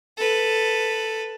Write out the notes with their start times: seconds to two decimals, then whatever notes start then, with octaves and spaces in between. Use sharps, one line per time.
0.17 A4 B4